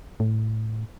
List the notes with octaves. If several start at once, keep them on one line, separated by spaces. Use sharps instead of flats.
A2